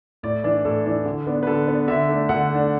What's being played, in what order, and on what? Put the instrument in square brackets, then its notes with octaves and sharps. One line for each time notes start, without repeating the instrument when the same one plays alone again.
[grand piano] A2 D5
E3 D4 D5
A2 A4
E3 D4
D3
B3 D4
B4
D3 A4
B3 D4
D3 E5
A3 D4
D3 F#5
A3 D4